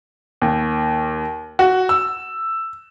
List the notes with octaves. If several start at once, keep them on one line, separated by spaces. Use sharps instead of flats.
D#2
F#4
E6